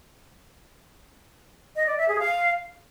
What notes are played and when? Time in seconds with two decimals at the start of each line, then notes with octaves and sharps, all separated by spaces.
1.76 D#5
1.87 D5
1.98 E5
2.08 G#4
2.19 F5